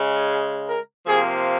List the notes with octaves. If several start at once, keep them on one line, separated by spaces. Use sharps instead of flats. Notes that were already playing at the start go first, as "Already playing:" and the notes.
Already playing: C#3 G#3
A#4
C3 F3 A#3 G#4